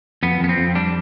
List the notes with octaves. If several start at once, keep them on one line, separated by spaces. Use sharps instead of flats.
F2 B3
F2 B3
C4
F2
G3 D4